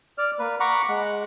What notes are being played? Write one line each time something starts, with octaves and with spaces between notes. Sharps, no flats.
D5 F6
A#3 B4
F#5 A#5 B5 C#6 D6
G#3 F#5